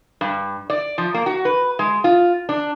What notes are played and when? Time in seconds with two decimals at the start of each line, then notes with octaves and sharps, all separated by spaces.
0.21 G2
0.70 D5
0.98 F3
1.14 A#3
1.26 F#4
1.45 B4
1.79 G#3
2.04 F4
2.49 D4